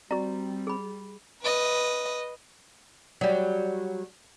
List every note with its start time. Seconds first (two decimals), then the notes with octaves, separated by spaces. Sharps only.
0.11 G3 C4 F#4 D5 A#5
0.67 G#4 B5
1.42 B4 D#5
3.21 F#3 G3